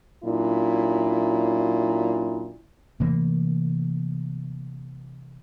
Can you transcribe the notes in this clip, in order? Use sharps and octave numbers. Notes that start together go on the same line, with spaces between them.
A#2 F#3 C#4 D4 E4
C3 E3 A3 A#3